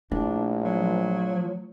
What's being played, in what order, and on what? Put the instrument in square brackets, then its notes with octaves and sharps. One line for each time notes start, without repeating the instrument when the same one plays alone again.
[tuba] A#1 [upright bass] A3 E4 [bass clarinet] D4
[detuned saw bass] F3 [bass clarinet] F#3